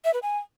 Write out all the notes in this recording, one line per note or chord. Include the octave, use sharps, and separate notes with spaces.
E5
B4
G#5